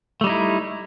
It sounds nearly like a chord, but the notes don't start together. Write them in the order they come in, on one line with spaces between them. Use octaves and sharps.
A3 G3 D#4 E4